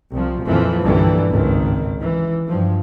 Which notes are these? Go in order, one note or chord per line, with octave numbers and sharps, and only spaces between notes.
C2 F3
F2 A#2 E3 F3
C2 G2 A#2 D3 E3 G3
G#1 C#2 D#3
E3
G2 F3